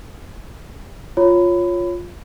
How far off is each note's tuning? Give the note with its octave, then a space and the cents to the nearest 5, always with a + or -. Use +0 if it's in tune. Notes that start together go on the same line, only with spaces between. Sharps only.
F4 +5 C#5 +0 B5 +20